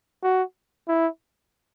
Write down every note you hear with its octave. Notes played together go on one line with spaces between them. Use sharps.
F#4
E4